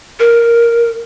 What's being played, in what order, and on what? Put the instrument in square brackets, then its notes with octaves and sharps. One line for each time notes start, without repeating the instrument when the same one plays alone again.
[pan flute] A#4